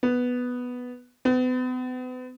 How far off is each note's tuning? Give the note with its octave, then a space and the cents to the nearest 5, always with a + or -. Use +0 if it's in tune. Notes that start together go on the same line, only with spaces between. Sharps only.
B3 +0
B3 +40